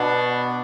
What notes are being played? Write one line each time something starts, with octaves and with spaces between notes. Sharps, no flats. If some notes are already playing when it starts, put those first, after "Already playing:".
Already playing: B2 B3 D4